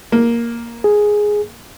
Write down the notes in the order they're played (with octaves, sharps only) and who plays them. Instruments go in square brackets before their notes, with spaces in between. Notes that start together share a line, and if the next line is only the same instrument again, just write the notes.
[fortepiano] A#3
[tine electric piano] G#4